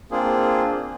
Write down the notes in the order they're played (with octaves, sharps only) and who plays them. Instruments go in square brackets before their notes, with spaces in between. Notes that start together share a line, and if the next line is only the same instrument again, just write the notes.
[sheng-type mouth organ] A#3 C4 D4 F4 G#4